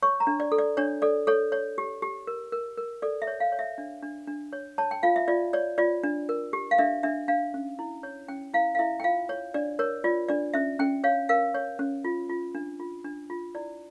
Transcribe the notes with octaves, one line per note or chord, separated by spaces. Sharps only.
C#5 C#6
A#5
D4
D5
A4
D5
D4 C#5
A4 D5
A4 C#5
C#5
G4
G4
A#4
A#4
A#4
A4 D5
E5
C#5
F5
C#5
E5
D4
D4
D4
C#5
C#5 A5
G5
F4 F5
E5
F4 D5
C#5 D5
F4 D5
D4
A#4
G4
F5
D4 E5
D4 E5
D4 F5
C#4
E4
C#5
C#4 G5
E4 F5
F5
E4 E5
G5
F4 F5
C#5
D4 D5
A#4 C#5
F4 D5
D4 D5
C#4 E5
C#4 G5
C#5 F5
A#4 F5
C#5
C#4
F4
F4
D4
F4
D4
F4
E4 D5